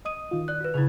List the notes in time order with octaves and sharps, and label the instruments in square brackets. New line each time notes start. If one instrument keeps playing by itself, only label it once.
[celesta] D#5 D#6 D#7
[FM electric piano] D#3 F4
[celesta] D5 F#6
F#4 B4
[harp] C#3 B3 G#6 [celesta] E4 F7